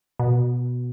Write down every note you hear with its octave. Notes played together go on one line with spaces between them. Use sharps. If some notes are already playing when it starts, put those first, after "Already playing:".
B2